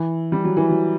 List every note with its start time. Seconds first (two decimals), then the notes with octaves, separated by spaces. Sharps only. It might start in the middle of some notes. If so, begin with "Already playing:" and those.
Already playing: E3
0.32 G3
0.44 F#3
0.57 E3
0.70 F#3